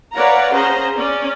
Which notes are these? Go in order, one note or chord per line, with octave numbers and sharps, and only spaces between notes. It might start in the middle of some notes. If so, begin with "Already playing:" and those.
B4 C#5 D5 F5 F#5 A#5
C#4 G#4 C5 A#5
C#4 D5